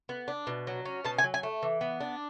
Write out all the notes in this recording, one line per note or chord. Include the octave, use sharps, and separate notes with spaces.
B3
D4
B2
F#3
C#4
B2 A5
G#5
F#3
G#5
A3
E3
B3
D4